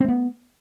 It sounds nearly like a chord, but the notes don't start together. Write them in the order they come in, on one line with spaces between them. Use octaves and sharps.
C4 A3 B3